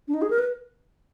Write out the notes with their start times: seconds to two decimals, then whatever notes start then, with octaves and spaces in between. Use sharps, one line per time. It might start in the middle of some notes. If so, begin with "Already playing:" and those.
0.08 D4
0.14 D#4
0.22 G#4
0.30 A#4
0.39 B4